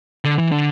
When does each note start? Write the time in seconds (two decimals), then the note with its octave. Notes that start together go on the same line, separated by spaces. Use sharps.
0.24 D3
0.38 E3
0.52 D3